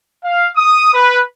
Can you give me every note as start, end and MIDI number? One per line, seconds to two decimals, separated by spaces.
0.24 0.50 77
0.56 0.91 87
0.93 1.20 71